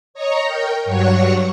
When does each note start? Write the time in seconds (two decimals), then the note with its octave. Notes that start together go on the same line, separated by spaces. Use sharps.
0.14 C#5 D#5 A#5 C#6
0.44 A#4 G5
0.85 G2 F#3 C#5 F#5 C#6